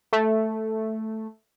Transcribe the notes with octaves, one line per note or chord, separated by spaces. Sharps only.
A3